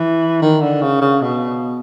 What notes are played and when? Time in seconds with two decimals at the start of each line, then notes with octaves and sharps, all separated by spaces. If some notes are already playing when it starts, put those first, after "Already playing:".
Already playing: E3
0.42 D#3
0.62 D3
0.82 C#3
1.01 C#3
1.22 B2